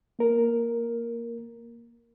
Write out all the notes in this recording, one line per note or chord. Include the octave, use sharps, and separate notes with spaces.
A#3 A#4